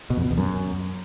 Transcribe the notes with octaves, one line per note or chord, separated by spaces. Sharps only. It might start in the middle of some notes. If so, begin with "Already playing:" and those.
B2
F2
B2
E2
F#2